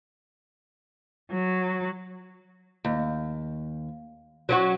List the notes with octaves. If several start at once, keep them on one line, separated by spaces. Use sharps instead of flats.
F#3
D#2
F#3 C#4 F#4